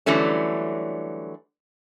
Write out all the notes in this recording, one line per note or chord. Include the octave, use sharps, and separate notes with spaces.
D3 E3 F#3 G3 A3 C#4